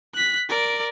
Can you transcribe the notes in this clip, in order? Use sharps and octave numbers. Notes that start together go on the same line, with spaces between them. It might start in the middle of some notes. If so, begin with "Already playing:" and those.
F#6 B6
A#4 D5